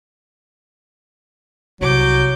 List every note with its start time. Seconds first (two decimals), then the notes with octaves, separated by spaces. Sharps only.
1.81 C2 F#3 D6 G6